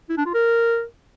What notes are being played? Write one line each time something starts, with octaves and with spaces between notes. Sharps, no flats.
E4
D4
F4
A#4